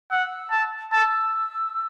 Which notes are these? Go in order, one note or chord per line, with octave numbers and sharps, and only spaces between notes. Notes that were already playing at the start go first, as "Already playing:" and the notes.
F#5 E6
A5
A5 E6